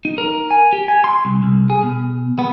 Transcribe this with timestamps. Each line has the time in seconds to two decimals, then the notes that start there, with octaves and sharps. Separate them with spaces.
0.05 D#4
0.18 A#4
0.51 G#5
0.73 G4
0.88 G#5
1.04 C6
1.25 C2
1.43 C2
1.70 G#4
1.83 B2
2.39 B3